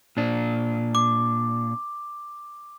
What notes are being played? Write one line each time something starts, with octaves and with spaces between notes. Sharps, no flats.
A#2 D4
D6